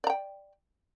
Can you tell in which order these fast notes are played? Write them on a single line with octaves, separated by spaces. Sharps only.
D5 A#5 G5